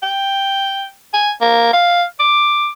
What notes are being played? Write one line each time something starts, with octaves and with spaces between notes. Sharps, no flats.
G5
G#5
A#3
F5
D6